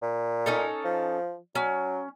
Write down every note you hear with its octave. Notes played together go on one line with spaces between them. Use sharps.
A#2
C#4 D#4 A4
F3
F#3 C#4